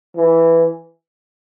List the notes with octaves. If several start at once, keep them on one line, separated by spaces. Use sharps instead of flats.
E3